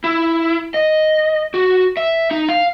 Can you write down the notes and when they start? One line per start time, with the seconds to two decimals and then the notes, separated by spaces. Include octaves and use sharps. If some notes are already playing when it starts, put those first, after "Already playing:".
0.04 E4
0.74 D#5
1.54 F#4
1.97 E5
2.31 D#4
2.49 F5